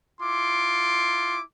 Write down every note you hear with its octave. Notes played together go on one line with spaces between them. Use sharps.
E4 F4 C6 D6